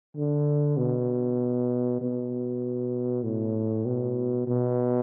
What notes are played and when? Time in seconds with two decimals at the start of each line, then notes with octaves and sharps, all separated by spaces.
0.17 D3
0.77 B2
2.01 B2
3.24 A2
3.85 B2
4.47 B2